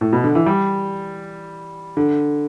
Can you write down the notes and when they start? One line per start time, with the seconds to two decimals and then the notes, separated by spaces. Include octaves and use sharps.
0.01 A2
0.13 B2
0.24 D3
0.35 E3
0.46 G3
1.97 D3